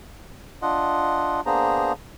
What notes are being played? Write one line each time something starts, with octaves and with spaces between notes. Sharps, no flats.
D4 F4 D#5 F#5
A#3 B3 D4 G#4 C5 A#5